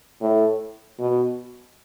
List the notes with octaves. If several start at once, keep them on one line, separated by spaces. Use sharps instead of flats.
A2
B2